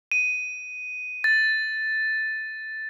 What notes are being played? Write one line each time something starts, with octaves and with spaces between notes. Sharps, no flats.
D#7
A6